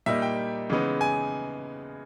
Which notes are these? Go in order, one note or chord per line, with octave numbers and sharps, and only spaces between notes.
A#2 G3 A#3 D#4 E5
G5
C#3 E3 G#3 B3 D#4
G#5